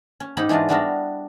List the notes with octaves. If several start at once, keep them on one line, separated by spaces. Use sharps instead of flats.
C#4
G#2 C#4 D#4 G4 B5
E3 G#3 D4 F4 F#4
G3 B3 D4 F#4 A#4 E5